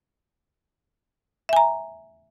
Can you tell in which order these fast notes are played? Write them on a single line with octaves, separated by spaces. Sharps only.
E5 G#5 A#5